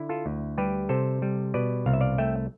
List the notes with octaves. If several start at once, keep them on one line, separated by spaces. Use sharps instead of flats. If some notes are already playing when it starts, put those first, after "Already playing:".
Already playing: D3 E4
F4 A4
D2
G3 G4 B4
C3 A4 C5
G3
B2 B4 D5
C2 F5
E5
D5 F5
A3 E5 G5